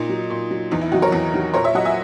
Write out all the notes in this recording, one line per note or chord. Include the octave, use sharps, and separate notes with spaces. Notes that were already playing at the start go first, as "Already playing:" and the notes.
Already playing: A#2 D#4
F#3
A#2
F#3
E2 D#4
E4
D#3 F#3 D#4 F#4
A#4 C#5
E2
D#3 F#3
A#2 A#4 C#5
C#5 E5
F#3 D#5 F#5
E5 G#5